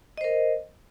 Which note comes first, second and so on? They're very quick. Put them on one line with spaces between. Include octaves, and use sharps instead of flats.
D#5 C5 A#4